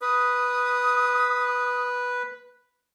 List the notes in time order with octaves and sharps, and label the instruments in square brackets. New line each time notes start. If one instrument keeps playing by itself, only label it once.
[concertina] B4 [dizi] D#6